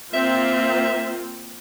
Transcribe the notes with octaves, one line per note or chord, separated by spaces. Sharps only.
A#3 C4 F4 E5